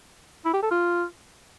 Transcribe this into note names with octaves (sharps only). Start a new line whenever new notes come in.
E4
G4
A4
F4